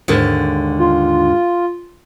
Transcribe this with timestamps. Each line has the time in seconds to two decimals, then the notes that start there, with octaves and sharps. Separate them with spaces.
0.08 D#2 G#2 D3
0.79 F4